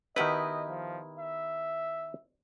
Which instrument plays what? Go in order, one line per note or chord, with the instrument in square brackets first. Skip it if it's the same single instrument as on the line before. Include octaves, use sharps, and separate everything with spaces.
[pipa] B2 E4 [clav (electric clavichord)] D#3 G4 B4 [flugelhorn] D#5
[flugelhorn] F3
E5